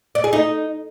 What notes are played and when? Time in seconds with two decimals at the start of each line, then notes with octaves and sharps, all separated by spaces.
0.15 D5
0.24 G#4
0.33 D#4